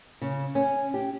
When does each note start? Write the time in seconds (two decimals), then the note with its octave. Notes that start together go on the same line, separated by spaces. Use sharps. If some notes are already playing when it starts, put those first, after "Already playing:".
0.22 C#3
0.55 C#4
0.94 G4